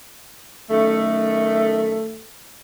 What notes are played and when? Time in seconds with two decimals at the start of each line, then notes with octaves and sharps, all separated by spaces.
0.70 F#2 D#3 A3